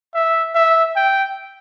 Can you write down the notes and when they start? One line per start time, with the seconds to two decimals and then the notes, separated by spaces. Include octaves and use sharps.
0.14 E5
0.55 E5
0.96 G5